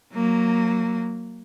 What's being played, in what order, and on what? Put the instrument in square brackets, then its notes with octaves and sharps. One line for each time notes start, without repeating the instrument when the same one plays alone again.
[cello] F#3 A#3